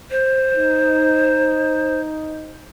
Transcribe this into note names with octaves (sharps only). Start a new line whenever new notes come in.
C5
D#4